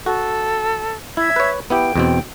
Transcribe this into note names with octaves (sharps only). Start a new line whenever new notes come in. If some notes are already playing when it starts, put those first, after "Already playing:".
F#4 A4
E4 E5 E6 G#6
B4 C#5
B3 E4 G4 G5
E2 B2 C4